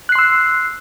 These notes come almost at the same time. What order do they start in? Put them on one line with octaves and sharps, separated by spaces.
F#6 C7 C6 E6